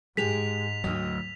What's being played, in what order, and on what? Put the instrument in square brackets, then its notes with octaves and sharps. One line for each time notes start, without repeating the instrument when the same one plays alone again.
[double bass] G#2 [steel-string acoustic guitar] G#3 G4 G#4 [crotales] B6 F7
[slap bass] D2 F#3 [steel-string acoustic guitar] D#5 G5